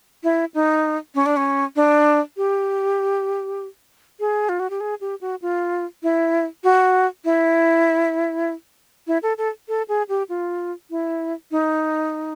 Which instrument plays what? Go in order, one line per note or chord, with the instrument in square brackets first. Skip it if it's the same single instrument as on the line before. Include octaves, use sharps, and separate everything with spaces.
[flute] E4
D#4
C#4
D4
C#4
D4
G4
G#4
F4
F#4
G4
G#4
G4
F#4
F4
E4
F#4
E4
E4
A4
A4
A4
G#4
G4
F4
E4
D#4